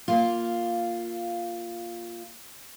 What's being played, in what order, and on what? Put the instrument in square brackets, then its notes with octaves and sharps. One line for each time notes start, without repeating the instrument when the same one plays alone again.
[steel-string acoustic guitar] A#3 F4